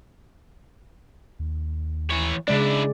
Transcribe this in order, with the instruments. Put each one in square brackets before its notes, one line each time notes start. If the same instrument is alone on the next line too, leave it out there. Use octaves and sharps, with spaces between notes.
[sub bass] D#2
[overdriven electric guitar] E3 C#5
[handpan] C#3 G#3 D5 [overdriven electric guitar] D4 E4